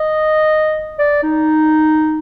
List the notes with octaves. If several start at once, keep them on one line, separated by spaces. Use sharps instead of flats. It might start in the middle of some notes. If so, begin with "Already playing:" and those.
Already playing: D#5
D5
D#4